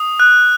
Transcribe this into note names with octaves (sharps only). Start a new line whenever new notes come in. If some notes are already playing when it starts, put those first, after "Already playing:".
Already playing: D#6
F#6